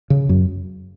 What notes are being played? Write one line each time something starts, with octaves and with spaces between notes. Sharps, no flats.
C#3
F#2